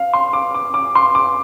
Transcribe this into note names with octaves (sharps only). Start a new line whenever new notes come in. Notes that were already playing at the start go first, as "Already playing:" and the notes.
Already playing: F5
C6
D6
D6
D6
C6
D6